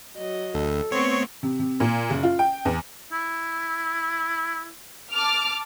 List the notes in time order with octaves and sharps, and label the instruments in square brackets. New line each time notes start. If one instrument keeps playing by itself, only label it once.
[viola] F#3 D#5
[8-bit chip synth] D2 [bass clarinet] A4
[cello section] A3 B3 C4 [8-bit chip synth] C#5 [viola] C6 C#6
[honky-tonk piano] C3
C3
A#2
F#1
F4
G5
E2
[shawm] E4
[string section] A5 D6 F6